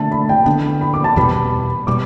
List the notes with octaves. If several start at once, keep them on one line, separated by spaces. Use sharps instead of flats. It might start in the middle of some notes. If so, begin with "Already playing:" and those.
Already playing: D3 A3 D4 A5
B5
G5
D3 B3 D4
B5
D6
A5
E2 B2 G3 B3 B5
B2 G3 D6